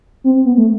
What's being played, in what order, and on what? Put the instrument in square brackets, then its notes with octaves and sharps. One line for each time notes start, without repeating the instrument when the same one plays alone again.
[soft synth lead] C4
B3
A3